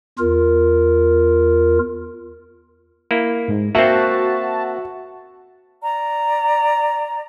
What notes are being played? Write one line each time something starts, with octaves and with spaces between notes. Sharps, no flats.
E2 F4 A#4
A#3 E4
G#2
A#3 C4 F#4 E5 A5
D5 A#5